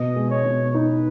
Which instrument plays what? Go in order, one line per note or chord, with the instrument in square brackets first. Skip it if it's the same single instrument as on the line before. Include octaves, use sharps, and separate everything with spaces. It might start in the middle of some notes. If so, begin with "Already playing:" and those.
Already playing: [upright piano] B2 [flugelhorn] D#5
[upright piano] G#3
[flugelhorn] C#5
[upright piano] B2
[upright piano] D#4 [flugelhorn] B4